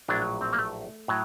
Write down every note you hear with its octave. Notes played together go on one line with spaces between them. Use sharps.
A#1 A2 F#3 D4
C4
A#3
A3
A2 F#3